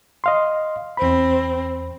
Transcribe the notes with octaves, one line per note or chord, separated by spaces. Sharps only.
D#5 F5 C6
E2 C4 B5